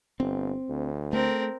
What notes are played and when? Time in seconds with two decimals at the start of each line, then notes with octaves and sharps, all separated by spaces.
0.20 G1 C4
0.69 D2
1.13 A3 C4 A#4